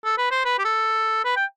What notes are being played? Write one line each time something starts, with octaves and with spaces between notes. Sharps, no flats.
A4
B4
C5
B4
G4
A4
B4
G5